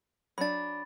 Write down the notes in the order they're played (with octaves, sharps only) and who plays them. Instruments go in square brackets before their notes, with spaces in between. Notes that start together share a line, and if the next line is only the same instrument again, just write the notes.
[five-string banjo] F#3 D4 [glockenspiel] B5 A6